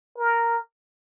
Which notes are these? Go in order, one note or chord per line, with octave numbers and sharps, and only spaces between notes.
A#4